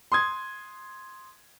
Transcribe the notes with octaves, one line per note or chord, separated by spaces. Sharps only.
C6 D#6 G#6